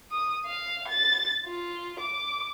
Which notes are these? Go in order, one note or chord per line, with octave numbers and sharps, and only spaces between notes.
D#6
F5
A6
F4
D6